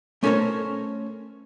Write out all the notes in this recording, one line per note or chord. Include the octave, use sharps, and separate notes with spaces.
A3 C#4 A4 A#4 C5 C#5